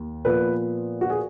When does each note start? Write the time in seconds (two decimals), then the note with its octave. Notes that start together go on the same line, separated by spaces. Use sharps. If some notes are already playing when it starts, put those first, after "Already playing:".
Already playing: D#2
0.25 A#2 F3 B3 B4
1.01 F#4
1.10 G#4